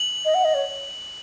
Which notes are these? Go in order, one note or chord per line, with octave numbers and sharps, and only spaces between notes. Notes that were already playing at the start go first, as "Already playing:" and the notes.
Already playing: F#7
D#5
F#5
D#5
C#5